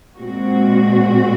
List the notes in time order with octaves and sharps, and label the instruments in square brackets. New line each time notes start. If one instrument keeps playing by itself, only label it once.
[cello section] A#2 G#3 C4 F#4